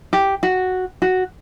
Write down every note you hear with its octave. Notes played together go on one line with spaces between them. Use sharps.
G4
F#4
F#4